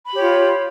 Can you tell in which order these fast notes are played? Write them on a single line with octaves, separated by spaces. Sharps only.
B5 G4 C#5 F4